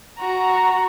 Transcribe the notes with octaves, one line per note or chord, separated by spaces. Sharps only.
F#4 A#5